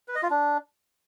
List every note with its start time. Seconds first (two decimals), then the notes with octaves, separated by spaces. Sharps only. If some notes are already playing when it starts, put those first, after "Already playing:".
0.08 B4
0.15 D#5
0.23 F4
0.30 D4